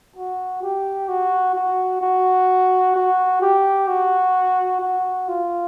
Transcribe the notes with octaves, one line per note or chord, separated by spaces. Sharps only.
F#4
G4
F#4
F#4
F#4
F#4
G4
F#4
F#4
F4